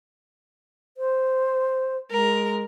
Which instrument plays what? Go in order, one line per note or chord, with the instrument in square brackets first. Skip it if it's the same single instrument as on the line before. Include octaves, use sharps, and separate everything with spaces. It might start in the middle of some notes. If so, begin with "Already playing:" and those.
[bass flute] C5
[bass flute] G#3 [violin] A#4